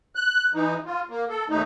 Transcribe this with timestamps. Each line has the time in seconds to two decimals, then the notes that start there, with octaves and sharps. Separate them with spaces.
0.15 F#6
0.54 E3 D#4
0.86 F4
1.09 A#3
1.29 A4
1.50 D#2 A3 D#4